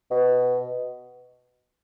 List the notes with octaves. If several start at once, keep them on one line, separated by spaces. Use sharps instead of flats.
B2